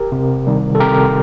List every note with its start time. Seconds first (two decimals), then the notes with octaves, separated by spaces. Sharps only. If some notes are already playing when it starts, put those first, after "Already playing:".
Already playing: G4 A#4
0.12 C3
0.47 D#3 G3
0.75 A4
0.80 C3 G4 A#4